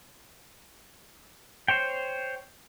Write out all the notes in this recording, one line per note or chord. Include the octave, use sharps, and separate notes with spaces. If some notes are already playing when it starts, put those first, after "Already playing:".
C5 C#5 G5